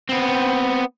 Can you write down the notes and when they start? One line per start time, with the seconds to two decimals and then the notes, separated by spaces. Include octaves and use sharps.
0.09 B3 C4